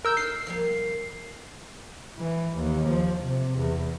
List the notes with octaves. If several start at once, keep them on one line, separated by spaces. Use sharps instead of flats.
A#4 E6 G6
D#4 A4 C7
F3 G3 A#3
E3
D#2
F3
C3
E2